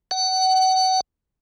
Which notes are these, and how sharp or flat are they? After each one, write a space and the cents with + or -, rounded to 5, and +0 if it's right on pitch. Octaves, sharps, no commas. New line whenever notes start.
F#5 +30